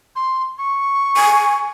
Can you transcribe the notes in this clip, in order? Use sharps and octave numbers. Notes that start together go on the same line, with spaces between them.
C6
C#6
G#5